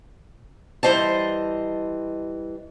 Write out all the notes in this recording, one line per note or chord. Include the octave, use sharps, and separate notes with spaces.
E3 G3 C5 D#5 A5